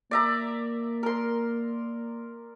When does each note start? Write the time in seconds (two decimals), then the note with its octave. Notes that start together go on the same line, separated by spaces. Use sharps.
0.11 A#3 D5 E5 A#5
1.03 A#4 C6